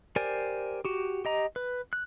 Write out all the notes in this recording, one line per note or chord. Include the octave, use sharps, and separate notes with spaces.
G4 A#4 C5 D5 G#5
F#4 G4
G4 D#5 A#5
B4
F#6